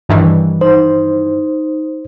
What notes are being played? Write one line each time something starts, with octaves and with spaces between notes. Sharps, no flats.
G2 D#3 E3
D#4 C5